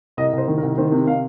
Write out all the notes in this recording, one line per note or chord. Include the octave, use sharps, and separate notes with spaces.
C2 D#5
C2 C5
D#3
A#4
C2
D#3 C5
C3
C3 F5